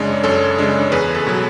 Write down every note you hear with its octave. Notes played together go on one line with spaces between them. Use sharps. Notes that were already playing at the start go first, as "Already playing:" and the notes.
Already playing: F#2 C#3 G#3 D4 C#5
F#2 A4 C#5
C#3 G#3 D4
E2 G#4 B4
A4
B2 F#3